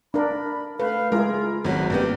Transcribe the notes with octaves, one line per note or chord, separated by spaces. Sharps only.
D4 A#4 B5
A3 B4 F5
G#3 E4 F4 G#4 A#4
G#1 D#3 F#3 F#4
G2 A#3 B3 G4